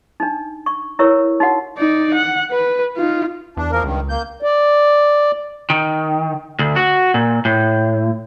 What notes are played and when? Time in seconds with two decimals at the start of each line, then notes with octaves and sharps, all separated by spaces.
0.20 D4 D#4
0.66 C#6
0.99 E4 A#4 B4 C#5 C#6 E6
1.40 D#4 F#4 F#5
1.78 D#4 D5
2.14 F#5
2.51 B4
2.97 D#4 F4
3.57 E2 D4
3.71 F3 A#3 A#4
3.84 C#2 G2 D#3
4.09 A#3 G6
4.42 D5
5.70 D#3
6.59 D2
6.76 F#4
7.14 A#2
7.45 A2